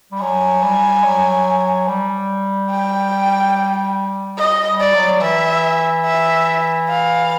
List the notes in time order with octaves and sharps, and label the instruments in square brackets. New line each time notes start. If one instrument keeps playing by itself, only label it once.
[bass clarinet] G3
[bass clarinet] F#3 [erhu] G#5
[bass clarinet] G3
F#3
G3
[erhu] G5
D#5
[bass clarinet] G3
[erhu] D5
[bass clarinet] F#3
[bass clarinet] E3 [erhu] E5
[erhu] E5
F5